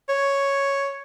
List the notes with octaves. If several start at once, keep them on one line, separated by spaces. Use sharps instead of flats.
C#5